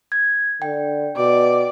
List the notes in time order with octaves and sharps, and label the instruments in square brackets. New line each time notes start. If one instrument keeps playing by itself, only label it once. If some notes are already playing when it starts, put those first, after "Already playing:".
[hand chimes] G#6
[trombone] D3 [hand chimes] G5
[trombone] B2 [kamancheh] D5